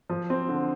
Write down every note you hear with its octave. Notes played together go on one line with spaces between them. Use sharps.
F3
C4
D3